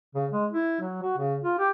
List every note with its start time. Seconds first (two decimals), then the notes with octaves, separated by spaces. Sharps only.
0.15 C#3
0.32 G#3
0.52 E4
0.81 F#3
1.02 F#4
1.17 C#3
1.44 F4
1.59 G4